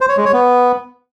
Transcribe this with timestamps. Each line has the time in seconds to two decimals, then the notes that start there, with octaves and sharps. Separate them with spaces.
0.01 C5
0.09 C#5
0.17 G#3
0.25 C#5
0.33 B3